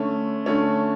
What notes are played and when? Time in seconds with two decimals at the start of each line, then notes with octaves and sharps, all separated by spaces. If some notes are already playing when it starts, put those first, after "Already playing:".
Already playing: D3 A3 C#4
0.46 D3 A3 C#4